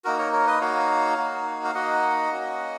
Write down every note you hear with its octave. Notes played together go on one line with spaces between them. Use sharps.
A#3 D#4 F#4 A#4
A#4 C#5
A#4 C#5
B4 D#5
A#3 D#4 F#4 C#5 F5
A#3 D#4 F#4
F5
A#3 D#4 F#4 D#5 F#5
A#3 C#4 F#4